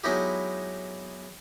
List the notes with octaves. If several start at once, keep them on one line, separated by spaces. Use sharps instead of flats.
F#3 G#3 B3 D#4 E4 G4